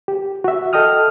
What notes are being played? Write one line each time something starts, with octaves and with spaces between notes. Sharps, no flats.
G4
F#4 E5
A4 D#5 G5 D#6 F6